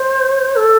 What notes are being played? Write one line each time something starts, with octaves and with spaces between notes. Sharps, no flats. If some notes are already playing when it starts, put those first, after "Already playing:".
Already playing: C5
A4